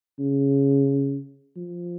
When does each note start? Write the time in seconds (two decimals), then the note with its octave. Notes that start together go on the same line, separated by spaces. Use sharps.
0.19 C#3
1.57 F3